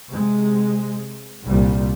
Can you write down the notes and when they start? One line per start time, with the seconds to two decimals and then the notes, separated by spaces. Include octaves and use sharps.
0.11 C3 G#3
1.46 C2 A#2 G3